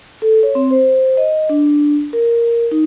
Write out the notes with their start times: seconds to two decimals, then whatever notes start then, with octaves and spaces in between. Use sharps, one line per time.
0.22 A4
0.43 C#5
0.55 C4
0.71 C5
1.17 D#5
1.49 D4
2.13 A#4
2.71 D#4